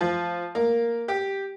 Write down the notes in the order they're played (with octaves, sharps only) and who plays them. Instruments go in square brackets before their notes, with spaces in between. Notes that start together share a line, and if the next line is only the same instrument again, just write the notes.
[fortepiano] F3
A#3
G4